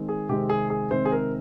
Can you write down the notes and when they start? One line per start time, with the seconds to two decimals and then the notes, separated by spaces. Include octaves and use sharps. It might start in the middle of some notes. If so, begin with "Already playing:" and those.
Already playing: D#3 G#3 C4
0.09 G#4
0.29 C3 D#3 G#3 C4 G4
0.49 G#4
0.70 G#4
0.91 C3 D#3 G#3 C4 C5
1.05 G#4
1.12 A#4